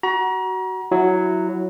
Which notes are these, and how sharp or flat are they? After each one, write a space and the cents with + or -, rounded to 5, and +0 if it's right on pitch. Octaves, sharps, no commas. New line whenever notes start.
F#4 +15 A#5 +35
F#3 +0 E4 +5